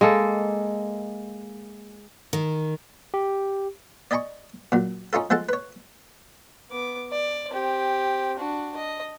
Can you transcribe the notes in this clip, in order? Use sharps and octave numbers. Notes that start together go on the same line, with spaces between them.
G#3 A#3 A4
D#3
G4
D5 D#5 G#5 B5 C#6
A#2 F#3
C#4 D#4 F4 A4
F3 G#3 A4 F#5 A5
B4 C#5
B3 D6
D5
C4 G4
D4 F#4
D#5